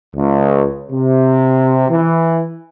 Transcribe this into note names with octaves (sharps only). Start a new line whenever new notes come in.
C#2
C3
E3